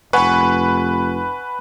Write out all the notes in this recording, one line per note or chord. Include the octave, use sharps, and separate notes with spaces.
F1 B4 F#5 G#5 C#6